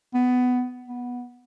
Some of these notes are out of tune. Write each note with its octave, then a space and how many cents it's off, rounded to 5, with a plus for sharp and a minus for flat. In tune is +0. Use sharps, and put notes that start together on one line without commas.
B3 +15
B3 -10